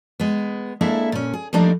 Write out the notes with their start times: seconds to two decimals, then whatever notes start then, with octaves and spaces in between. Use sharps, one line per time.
0.19 G#3 B3
0.81 G#3 A#3 D4 E4 A4 E5
1.12 A#2 C#4
1.33 G#4
1.53 F3 G3 A3 A#3 D4 D#4